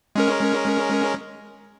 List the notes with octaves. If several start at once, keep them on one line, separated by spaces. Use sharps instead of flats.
G#3 C#4 A#4